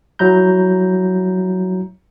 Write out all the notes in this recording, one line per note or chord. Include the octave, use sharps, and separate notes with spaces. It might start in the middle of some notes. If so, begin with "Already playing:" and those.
F#3 E4 A#5 G6